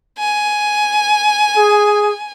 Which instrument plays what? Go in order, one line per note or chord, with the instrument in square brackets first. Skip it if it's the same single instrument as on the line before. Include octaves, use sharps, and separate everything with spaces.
[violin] G#5
[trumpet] G#4